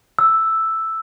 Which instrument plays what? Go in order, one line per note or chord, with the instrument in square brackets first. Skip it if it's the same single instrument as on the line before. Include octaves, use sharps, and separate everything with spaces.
[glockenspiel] E6